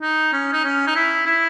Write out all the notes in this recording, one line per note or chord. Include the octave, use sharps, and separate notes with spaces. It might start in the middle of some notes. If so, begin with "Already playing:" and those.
D#4
C#4
D#4
C#4
D#4
E4
E4